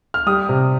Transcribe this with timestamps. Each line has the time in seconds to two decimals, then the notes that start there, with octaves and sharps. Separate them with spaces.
0.14 F6
0.26 G3 D#6
0.49 C3